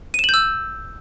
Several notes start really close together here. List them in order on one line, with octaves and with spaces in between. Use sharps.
D#7 E7 F#7 G6 E6